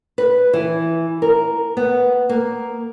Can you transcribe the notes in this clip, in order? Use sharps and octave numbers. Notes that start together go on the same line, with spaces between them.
B4
E3
A#4
B3
A#3